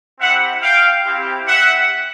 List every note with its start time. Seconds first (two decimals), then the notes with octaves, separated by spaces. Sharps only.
0.20 C4 E4 G4 E5 F#5
0.62 F5 G5
1.05 C4 E4 G4
1.47 E5 F#5